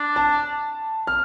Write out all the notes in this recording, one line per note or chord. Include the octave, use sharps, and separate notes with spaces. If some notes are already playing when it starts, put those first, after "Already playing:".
Already playing: D4
A5
F6